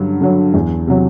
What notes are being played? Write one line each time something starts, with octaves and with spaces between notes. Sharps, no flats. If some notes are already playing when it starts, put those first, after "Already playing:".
Already playing: G2 D3 F#3
D3 F#3
E2
C3 F#3